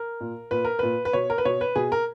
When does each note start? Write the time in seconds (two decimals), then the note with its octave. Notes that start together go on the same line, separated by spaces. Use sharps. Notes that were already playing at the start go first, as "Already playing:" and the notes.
Already playing: A#4
0.20 A#2
0.51 A#2 B4
0.65 A#4
0.79 A#2 B4
1.05 B4
1.13 B2 C#5
1.30 A#4
1.38 B4
1.45 B2 C#5
1.61 B4
1.76 B2 G#4
1.92 A#4